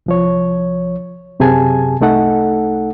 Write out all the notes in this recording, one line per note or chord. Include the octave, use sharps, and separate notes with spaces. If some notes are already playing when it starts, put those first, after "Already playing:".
C2 F3 C#5
F#2 C3 G4 G#4 G#5 A5
C2 A3 D#4 A4 F#5